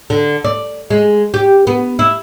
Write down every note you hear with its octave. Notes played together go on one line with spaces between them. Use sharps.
D3
D5
G#3
G4
B3
E4